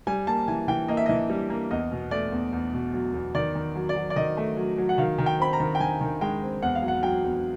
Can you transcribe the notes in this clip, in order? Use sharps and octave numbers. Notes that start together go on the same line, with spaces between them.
G3 G#5
A#3 A5
E3 G#5
E3 G5
A#3 D#5
E5
E3 D#5
G3
A#3
E2 D#5
B2
A3 D5
E2
E2
B2
F#3
E2
D#3 D5
D#3
F#3
D5
F#3
D5
D#3 D#5
A3
F#3
F#3
F#5
D#3 F5
D#3
G5
C4 B5
A#5
D#3
G5
D#3 G#5
D#3
G#3 G5
C4
E2 F#5
F5
F#3
F#5
F#3 G5
E2